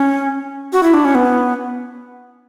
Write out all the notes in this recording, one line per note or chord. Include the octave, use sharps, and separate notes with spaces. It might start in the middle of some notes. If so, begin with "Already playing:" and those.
Already playing: C#4
F#4
E4
D4
C#4
B3